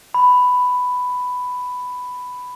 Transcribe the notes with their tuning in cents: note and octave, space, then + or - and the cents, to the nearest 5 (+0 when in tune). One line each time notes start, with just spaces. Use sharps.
B5 +10